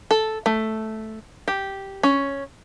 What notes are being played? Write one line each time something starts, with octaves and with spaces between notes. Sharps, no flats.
A4
A3
G4
C#4